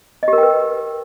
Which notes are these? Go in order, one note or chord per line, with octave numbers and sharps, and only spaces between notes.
D#5
G4
A#4
G5
B4